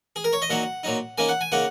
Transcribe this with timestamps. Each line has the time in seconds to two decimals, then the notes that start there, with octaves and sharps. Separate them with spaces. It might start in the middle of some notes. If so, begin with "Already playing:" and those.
0.16 G#4
0.24 A#4
0.33 C#5
0.42 D#5
0.50 A#2 F#3 D#4 F#5
0.83 A#2 F#3 D#4
1.18 C#3 A#3 D#4 G#5
1.29 F#5
1.41 G#5
1.52 C#3 A#3 D#4 F#5